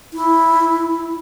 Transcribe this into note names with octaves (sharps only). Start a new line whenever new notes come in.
E4